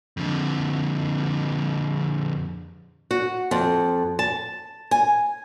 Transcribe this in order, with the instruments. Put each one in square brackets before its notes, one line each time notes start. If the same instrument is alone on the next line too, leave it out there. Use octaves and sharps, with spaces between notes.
[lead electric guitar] F2 D3
[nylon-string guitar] F#4
F2
A5
G#5